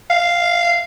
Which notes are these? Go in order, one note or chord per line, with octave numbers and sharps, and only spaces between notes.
F5